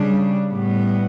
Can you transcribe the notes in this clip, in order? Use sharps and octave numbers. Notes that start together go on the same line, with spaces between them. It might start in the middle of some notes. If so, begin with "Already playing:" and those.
Already playing: C#3 G3 D4
A2 G3 B3